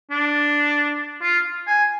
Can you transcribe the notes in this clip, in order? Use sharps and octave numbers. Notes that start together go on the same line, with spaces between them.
D4
F4
G#5